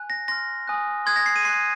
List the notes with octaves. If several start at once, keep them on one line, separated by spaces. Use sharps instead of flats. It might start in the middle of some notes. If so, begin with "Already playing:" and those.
Already playing: G#5 F#6
A#6
C6 F6 A#6
G#5 D#6 F#6
C6 D#6 F#6 G#6
A#6
C7
D#7
C6 F#6 C7